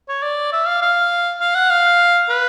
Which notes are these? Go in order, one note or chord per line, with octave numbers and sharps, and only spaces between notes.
C#5
D5
E5
F5
F5
F5
F#5
F5
B4